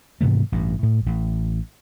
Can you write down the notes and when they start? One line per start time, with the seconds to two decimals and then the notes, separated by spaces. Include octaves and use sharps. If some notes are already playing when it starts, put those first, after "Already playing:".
0.21 G#2 C3 E3 A3
0.52 A1 G2
0.83 A2
1.06 A1